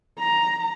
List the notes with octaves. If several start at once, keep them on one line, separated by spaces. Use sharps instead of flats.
A#5